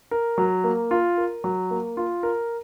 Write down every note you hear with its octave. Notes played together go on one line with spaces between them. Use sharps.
A#4
F#3
A#3
F4
A#4
F#3
A#3
F4
A#4